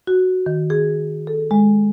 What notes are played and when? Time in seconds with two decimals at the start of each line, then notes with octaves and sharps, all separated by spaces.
0.07 F#4
0.46 D#3
0.70 G#4
1.27 A4
1.51 G#3